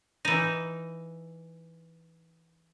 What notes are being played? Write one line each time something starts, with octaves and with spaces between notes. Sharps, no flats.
E3 D#4